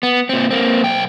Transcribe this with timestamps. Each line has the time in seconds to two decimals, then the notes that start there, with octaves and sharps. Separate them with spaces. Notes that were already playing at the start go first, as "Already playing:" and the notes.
0.03 B3
0.29 A#2 C4
0.51 A#3 C4
0.82 B1 G5